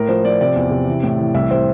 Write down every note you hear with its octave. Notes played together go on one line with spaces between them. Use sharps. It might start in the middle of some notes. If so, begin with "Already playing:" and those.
Already playing: A2 A#4
F3 C5
F3 D5
C3 D5
E2
C3
E3
A2
E3
C2 E5
C3 C5